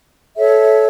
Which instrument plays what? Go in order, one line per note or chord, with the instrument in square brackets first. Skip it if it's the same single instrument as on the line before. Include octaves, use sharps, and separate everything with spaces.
[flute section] A4 C#5 E5